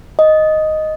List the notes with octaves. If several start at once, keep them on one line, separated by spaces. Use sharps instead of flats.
D#5